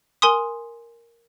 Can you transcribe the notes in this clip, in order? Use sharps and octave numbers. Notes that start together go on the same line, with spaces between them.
A#4 G#5 C6 D#6